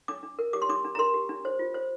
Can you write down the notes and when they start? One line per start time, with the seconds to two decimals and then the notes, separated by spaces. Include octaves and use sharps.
0.08 D4 D6
0.23 D4
0.39 A#4
0.53 G4 D6
0.62 C6
0.69 D4 D6
0.85 D4
0.95 A#5
0.99 A#4 C6
1.14 G4
1.29 D4
1.45 C5
1.59 F4
1.74 C5